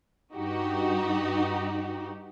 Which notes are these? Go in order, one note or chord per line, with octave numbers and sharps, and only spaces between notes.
G2 D#4 F#4 G4